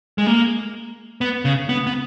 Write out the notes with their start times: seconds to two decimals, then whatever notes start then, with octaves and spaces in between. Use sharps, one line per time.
0.18 G#3
0.27 A#3
1.21 B3
1.45 C#3
1.69 B3
1.87 B3